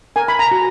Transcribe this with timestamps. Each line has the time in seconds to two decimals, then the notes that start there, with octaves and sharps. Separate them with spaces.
0.16 A#4 G#5
0.28 B5
0.39 A#5
0.51 F#4